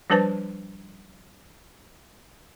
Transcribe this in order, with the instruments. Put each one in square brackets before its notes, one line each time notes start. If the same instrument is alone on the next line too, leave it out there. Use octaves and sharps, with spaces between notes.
[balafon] F3 G3 D4 B4 C5 A5